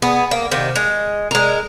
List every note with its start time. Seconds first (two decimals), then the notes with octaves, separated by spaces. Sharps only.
0.02 B3 G#4
0.31 A#3
0.51 C3 D#3
0.76 G#3
1.31 G#3 A#4